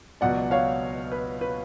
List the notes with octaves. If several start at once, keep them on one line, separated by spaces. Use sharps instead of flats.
C#2 B2 F#3 D5 F#5
C#5 F5
B4
B4